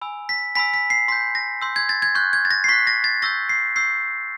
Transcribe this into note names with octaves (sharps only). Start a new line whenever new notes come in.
G#5 B5 E6
B6
G#5 B5 E6 B6
B6
C7
C6 E6 G6 B6
A#6
C6 E6 G6
G#6
A6
G#6
C#6 F#6 G6
G#6
A6
A#6
C7
C#6 F#6 B6
A#6
A6
C#6 E6 G6 A#6
C7
C#6 E6 G6 C7